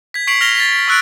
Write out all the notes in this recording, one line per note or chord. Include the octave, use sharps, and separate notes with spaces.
G#6 B6
C#6 B6 C7 D7 F7 F#7
F6 A#6 F7 G7
A6 B6
B6
C#6 E6 F#6 A6 D7